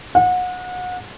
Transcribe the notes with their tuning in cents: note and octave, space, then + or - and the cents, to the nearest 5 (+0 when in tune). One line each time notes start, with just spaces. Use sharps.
F#5 -30